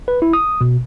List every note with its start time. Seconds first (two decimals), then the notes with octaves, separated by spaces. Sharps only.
0.08 B4
0.22 E4
0.33 D#6
0.61 B2